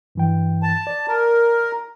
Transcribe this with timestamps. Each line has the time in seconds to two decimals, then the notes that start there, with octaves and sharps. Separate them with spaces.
0.15 G2 E3 G5
0.63 A5
0.87 D5
1.08 A#4